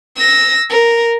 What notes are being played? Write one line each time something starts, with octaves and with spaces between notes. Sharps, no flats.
E6 A#6
A#4